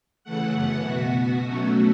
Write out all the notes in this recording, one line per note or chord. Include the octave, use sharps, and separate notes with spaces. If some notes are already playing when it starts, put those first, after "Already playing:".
C#3 E3 A3 F#5
F#2 E3 B3
B2 B3 F#4
B2 B3 F#4
B2 F#3 A3 C#4 F#4